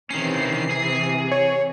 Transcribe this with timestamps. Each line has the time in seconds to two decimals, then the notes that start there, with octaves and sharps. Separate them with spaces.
0.10 C3 D#3 E3 C#4 C7
0.70 G#4
1.32 C#5